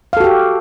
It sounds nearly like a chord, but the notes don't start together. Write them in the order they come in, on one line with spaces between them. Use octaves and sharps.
F5 A4 F#4 G4